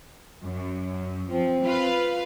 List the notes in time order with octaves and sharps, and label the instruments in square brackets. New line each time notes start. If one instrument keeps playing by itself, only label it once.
[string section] F#2
[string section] F3 [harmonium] C4
[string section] F4 B4 F5